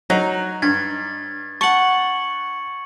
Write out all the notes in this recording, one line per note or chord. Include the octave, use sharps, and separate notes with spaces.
F#3 D#4
G2 G#6 A6
F#5 A5 C#6 C#7 F#7